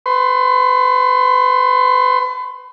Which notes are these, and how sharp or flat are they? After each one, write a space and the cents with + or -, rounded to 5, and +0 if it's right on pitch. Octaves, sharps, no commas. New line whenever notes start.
B4 +35 C6 +15